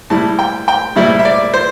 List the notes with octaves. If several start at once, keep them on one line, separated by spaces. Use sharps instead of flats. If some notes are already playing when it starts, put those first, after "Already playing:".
A2 G3 E4 A5
G5
G5
A2 G3 E4 E5
E5
D5
C5